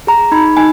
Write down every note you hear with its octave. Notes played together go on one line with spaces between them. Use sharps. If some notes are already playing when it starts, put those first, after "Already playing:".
G#4 A#5
D#4 B5
D#4 G#5